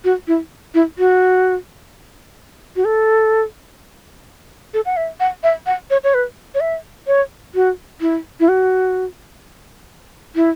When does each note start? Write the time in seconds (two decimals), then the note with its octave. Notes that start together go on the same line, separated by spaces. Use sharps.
0.04 F#4
0.28 E4
0.74 E4
0.98 F#4
2.76 F#4
2.86 A4
4.74 A4
4.86 F#5
4.97 E5
5.20 F#5
5.43 E5
5.66 F#5
5.90 C#5
6.04 C#5
6.14 B4
6.55 C#5
6.60 E5
7.07 C#5
7.55 F#4
8.01 E4
8.40 E4
8.48 F#4
10.35 E4